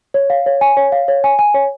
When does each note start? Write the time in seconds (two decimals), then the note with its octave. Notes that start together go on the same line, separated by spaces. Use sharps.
0.14 C#5
0.30 F5
0.46 C#5
0.61 G#5
0.77 C#5
0.92 F5
1.08 C#5
1.24 G#5
1.39 G#5
1.54 C#5